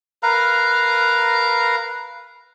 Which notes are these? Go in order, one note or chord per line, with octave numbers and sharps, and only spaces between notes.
A#4 B4 F5 A#5